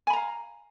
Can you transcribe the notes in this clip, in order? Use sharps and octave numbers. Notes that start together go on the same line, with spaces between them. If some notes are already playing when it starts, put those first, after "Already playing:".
F5 G#5 A#5 B5